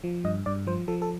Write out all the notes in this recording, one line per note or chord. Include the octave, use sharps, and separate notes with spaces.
F3
G2 D#5
G2 D5
F3 C5
F3 A4
A4